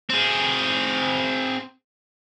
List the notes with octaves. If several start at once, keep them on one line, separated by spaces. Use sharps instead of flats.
C4 G#4